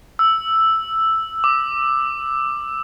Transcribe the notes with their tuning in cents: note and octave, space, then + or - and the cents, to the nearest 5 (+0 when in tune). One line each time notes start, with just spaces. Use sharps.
E6 +0
D6 +15